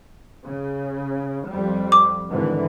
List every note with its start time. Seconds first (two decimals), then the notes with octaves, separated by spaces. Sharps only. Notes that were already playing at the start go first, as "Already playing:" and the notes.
0.45 C#3
1.47 F2 G3
1.92 D6
2.29 G#1 D3 E3